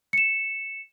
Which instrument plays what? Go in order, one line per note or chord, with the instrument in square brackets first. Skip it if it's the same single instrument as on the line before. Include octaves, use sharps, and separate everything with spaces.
[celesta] C#7 E7